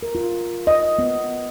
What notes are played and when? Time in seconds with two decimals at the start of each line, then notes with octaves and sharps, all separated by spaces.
0.03 A#4
0.15 F4
0.67 D#5
0.99 B3